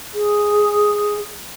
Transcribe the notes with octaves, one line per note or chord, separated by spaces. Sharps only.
G#4